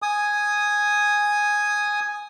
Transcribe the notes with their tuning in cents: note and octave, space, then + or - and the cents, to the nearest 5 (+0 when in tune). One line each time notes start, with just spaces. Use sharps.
G#5 +0 D#6 +0